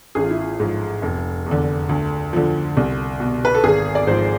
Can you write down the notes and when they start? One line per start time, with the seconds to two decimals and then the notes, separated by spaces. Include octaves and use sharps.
0.15 A1 G#4
0.24 F4
0.31 E4
0.39 F4
0.60 G#2 F3
1.02 F1
1.46 E2 D3
1.89 D2
2.33 D3 F3
2.77 C2
3.20 B2
3.45 B4
3.55 A4
3.64 G#1 G#4
3.95 D5
4.07 G#2 F3 C5